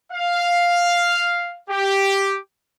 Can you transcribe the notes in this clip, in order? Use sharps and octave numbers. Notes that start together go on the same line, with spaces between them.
F5
G4